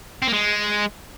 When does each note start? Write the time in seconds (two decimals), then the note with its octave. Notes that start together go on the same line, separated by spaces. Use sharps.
0.22 C4
0.28 A#3
0.33 G#3